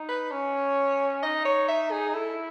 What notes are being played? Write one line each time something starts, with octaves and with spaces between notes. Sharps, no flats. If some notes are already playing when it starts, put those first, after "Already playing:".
Already playing: D#4
B4
C#4 C#5
D#4 D#5
C#5
E5
G#4
E4 A4